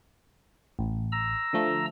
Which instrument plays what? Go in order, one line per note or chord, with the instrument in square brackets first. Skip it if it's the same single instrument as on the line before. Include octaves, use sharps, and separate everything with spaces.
[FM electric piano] A1
[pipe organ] A#5 E6
[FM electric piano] D3 F3 A3